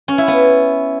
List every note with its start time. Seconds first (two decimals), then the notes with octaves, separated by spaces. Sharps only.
0.08 C#4
0.18 E4
0.28 B3